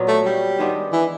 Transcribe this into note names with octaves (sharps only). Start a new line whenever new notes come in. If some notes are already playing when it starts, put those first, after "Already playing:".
Already playing: A#2 F#3 B3
A3
G3
D#3 G#3 B3 D4
E3